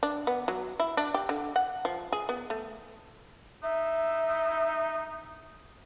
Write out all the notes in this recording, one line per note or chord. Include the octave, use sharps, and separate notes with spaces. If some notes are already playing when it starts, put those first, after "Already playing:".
D4
B3
F#3
E4
D4
G4
D3
F#5
F3
G#4
B3
A3
D#4 E5